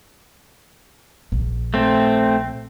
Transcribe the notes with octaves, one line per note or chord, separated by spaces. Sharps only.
A#1
A3 C4